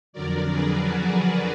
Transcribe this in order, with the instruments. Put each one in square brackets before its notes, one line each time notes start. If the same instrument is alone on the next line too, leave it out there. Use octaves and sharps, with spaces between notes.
[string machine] F2 D3 F#3 A#4 D5
G#4 B4
F#4 A#4